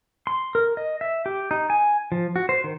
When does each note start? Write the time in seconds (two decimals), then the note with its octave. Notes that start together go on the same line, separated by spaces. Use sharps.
0.27 C6
0.55 A#4
0.77 D#5
1.01 E5
1.26 G4
1.51 D#4
1.70 G#5
2.12 F3
2.36 F#4
2.49 C5
2.64 D#3